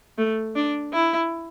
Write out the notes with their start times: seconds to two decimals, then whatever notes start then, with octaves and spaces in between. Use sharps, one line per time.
0.18 A3
0.56 D4
0.94 E4